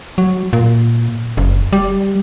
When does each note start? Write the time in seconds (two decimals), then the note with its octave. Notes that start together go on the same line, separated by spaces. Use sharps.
0.18 F#3
0.53 A#2
1.37 F#1
1.73 G3